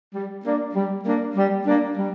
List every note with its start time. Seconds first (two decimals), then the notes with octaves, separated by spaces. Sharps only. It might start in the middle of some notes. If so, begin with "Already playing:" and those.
0.15 G3
0.45 A#3 D4
0.75 G3
1.05 A#3 D4
1.36 G3
1.66 A#3 D4
1.97 G3